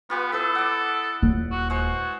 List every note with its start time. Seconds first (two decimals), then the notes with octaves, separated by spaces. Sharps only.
0.10 B3 F4 G4 B4
0.32 B3 E4 A4 B4
0.55 D5 F#5
1.23 D#1
1.51 F#4
1.70 G#3 F#4 C5